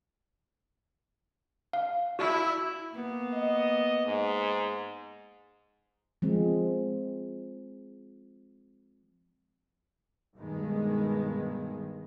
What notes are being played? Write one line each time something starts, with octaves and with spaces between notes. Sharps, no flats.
F5
E4 F#4
A#3 B3
D#5
G#2
F3 G#3 C4
G2 B2 D#3 G#3